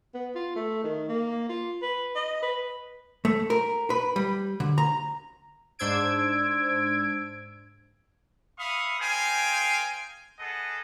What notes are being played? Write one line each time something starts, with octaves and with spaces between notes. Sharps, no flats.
B3
F4
A3
D#3
A#3
F4
B4
D#5
B4
A3
A#4
B4
G3
D3
A#5
G#2 D4 C5 E6 G#6 D7
E5 F5 B5 C#6 D#6
G#4 A#4 C5 F5 G5 G#5
B3 G#4 A4 D#5 F#5